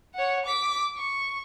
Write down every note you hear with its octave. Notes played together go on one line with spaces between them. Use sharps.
C#5 F#5
D6 B6
C#6